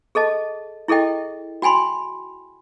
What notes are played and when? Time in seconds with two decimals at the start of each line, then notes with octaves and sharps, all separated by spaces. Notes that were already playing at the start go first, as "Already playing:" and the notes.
0.15 G#4 A4 D#5 A5
0.88 E4 G#4 A4 D#5 G5
1.62 F#4 G5 G#5 B5 C6